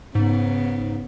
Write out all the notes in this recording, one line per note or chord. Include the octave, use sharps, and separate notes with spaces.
G#2 C#3 B3